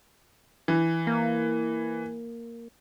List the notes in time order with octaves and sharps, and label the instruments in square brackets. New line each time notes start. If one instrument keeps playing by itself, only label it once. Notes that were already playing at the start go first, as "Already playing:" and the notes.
[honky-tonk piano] E3
[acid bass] A#3